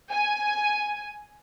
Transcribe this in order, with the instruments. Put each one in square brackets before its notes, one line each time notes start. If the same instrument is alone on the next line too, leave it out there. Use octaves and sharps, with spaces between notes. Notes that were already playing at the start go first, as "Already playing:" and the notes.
[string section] G#5